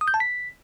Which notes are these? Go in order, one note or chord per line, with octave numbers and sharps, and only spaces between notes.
D#6
G6
A5
B6